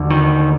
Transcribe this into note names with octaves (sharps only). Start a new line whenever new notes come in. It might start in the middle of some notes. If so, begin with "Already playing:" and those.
Already playing: D#2 D3
D#3